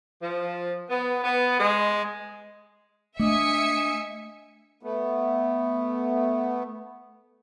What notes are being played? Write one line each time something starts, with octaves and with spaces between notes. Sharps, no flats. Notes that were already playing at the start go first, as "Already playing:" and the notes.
F3
B3
B3
G#3
A3 D4 D#5 E5 G#5 D#6 C#7
A3 B3